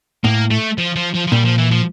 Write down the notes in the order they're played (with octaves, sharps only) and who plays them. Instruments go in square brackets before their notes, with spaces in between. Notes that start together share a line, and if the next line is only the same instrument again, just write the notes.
[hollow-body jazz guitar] A2 [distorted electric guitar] A#3
[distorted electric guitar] A3
F3
F3
F3
F3
[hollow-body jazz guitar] A#2 [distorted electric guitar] G3
[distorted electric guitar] F3
E3
F3